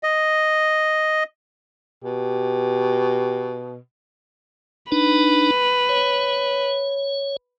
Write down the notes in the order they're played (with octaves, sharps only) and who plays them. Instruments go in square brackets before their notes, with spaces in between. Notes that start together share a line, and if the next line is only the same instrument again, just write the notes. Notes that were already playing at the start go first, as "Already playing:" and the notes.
[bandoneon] D#5
[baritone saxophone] B2 [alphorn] G4
[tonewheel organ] D4 D#4 [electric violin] B4
[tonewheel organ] C#5